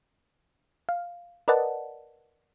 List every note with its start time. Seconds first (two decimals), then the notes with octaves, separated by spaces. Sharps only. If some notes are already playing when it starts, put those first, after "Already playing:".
0.89 F5
1.48 A#4 B4 D5 D#5 F#5 A5